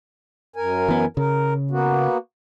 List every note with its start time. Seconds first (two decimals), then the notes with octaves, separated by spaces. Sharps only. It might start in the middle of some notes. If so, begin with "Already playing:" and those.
0.56 F#2 A#4 G#5
0.88 E3 B3
1.17 C#3 A#4
1.71 A#3 B3 F#4